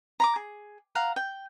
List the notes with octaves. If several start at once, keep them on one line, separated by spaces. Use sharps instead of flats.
A#5 B5 D6
G#4
F5 F#5 A#5
G5